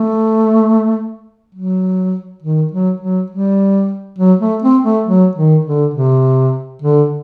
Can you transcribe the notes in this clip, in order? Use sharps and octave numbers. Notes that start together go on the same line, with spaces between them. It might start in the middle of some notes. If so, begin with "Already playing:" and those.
Already playing: A3
F#3
D#3
F#3
F#3
G3
F#3
A3
C4
A3
F#3
D#3
D3
C3
D3